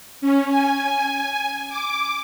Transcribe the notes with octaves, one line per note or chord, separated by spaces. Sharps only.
C#4
G#5
D6